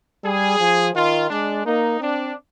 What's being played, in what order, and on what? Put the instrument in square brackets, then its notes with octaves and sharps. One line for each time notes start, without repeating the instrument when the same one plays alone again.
[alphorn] G3 [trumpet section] G#4
[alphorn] F3
[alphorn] D#3 [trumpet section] F4
[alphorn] G#3 [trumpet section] D4
[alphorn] A#3 [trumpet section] D#4
[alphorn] C4 [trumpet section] D4